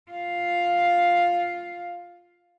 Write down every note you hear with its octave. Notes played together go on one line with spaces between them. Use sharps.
F4 F5